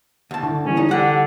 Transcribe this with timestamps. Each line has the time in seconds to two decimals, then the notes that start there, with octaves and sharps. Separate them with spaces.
0.31 D2 A5
0.43 D3
0.65 E3 G3 A#3 C#4
0.77 D#4
0.89 D3 G3 G4 F#5